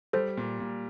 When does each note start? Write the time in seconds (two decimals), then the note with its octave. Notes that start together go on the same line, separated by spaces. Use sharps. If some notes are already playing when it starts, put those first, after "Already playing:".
0.13 G3 A4 C5
0.37 A#2
0.60 A#2